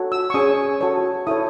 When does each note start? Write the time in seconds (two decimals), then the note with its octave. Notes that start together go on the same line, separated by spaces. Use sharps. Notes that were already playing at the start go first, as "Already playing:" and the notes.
Already playing: F#4 A4 C#5
0.12 E6
0.30 C#6
0.34 C#4 G#4 C#5 D#6
0.81 F#4 A4 C#5
1.27 E4 A4 C#5 D#6